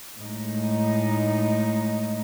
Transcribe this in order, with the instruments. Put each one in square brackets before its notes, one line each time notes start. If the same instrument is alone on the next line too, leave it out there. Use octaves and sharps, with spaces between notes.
[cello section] A2 G#3 D#4